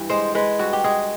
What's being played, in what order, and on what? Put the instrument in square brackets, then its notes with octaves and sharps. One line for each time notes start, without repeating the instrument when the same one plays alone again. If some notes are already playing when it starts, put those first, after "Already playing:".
Already playing: [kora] G2 E3
G#3 C5
G#3 B4
G2 F#4
G4
G#3 G#4